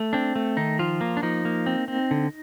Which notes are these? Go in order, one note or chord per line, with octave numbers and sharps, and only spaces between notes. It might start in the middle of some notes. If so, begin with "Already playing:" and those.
Already playing: A3
C4 D4
A3
D#3 D#4
F3 F4
A#3
D4
F3 D#4
A#3
C4
C4
D3